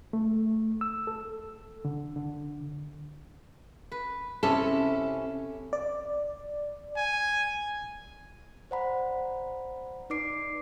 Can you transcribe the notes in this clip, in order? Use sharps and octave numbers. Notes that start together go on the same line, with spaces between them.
A3
E6
A4
D3
D3
B4
C3 C#4 E4 A4
D5
G#5
C5 D5 F#5 A#5 B5
D#4 B4 D5 D6 C7 D7